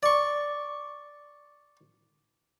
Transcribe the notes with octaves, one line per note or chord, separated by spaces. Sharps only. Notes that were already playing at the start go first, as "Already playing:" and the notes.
D5 C#6